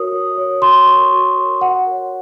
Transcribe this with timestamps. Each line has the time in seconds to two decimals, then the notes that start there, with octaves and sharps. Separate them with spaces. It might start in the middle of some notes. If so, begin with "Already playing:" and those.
Already playing: F#4 A#4 C#5 D#6
0.12 F#4
0.38 A#4 C#5
0.62 F#4 C6
0.87 A#4 C#5 C#6
1.12 F#4
1.36 A#4 C#5
1.61 F#4 F#5
1.87 A#4 C#5